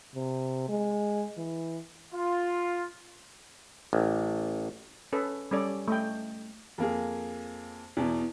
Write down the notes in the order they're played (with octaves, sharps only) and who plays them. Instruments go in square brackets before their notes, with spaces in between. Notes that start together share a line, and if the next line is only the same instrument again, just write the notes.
[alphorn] C3
G#3
E3
[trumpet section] F4
[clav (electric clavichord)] A1
[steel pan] C#4 A4 B4
G3 C#4 A4 D5
A3 D#5 G5
[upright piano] F2 A#3 G#4
E2 B2